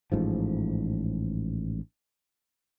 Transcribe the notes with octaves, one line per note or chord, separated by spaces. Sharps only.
A1 G#2 F3